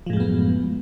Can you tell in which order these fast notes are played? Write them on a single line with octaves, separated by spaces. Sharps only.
F3 A2 G#3 F#2 B3